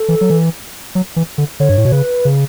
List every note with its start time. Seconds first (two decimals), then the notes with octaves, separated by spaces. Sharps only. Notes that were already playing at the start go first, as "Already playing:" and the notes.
Already playing: A4
0.08 E3
0.21 F#3
0.30 E3
0.95 F#3
1.16 E3
1.38 D3
1.60 D3 C#5
1.69 G2
1.77 A2
1.85 B2
1.92 C#3 B4
2.25 C#3